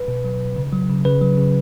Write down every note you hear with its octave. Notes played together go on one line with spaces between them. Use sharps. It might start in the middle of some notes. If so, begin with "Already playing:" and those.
Already playing: B4
B2
F#3
B2
C#3
F#3
C#3
C#3 B4
F#3
C#3